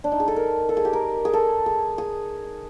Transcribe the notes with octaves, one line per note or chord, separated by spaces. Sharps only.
D4
D#4
G#4
A4
A#4
A4
G#4
G4
A#4
G#4
A4
G#4
G#4